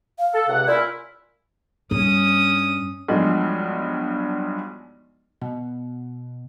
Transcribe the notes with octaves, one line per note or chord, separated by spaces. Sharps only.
F5
A4
C#2 C3 F#5
A#2 C#4 E4 D5
G2 C#4 D#6
B1 G2 F3 G#3
B2